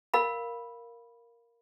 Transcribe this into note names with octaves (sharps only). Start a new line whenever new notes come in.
A#4 F5 B5